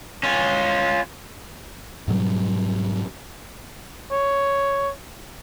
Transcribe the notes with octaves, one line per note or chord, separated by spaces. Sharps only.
C#4 F4
G#2 B2 F#3 G3
C#5